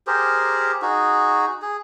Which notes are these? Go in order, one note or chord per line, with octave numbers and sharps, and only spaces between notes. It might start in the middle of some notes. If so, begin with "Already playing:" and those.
G4 G#4 A#4 C5
D#4 F#4 G#4
G#4